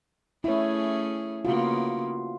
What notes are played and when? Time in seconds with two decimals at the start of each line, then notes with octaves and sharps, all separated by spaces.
0.44 A3 C#4 E4 G#4 C#5
1.45 C#3 A#3 B3 F4 F#4